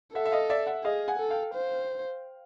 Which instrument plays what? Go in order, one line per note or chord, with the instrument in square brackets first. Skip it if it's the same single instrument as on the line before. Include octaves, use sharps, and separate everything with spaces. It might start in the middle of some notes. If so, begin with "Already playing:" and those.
[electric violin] A4 [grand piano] E5 F#5
[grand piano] E5
D#5 F5
D5 E5
E5 F#5
[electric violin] G#4 [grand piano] D#5 F5
[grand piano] F#5 G#5
[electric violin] A4
[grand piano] F5 G5
[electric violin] C5